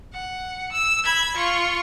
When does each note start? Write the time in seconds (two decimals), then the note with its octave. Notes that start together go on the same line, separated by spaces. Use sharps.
0.13 F#5
0.72 E6
1.05 B5 G#6
1.37 F4 C#6